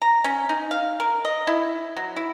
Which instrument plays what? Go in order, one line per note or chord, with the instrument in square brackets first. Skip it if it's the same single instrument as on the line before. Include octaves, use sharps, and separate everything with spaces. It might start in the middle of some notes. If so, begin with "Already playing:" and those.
[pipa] A#5
C#4
D#4
F5
A#4
D#5
E4
F#3
E4